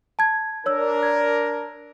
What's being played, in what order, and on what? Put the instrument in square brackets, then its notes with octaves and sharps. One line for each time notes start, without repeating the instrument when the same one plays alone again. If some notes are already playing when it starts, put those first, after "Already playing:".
[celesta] A5 G#6
[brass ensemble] D4 A#4 [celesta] C#5 E6
[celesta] G#6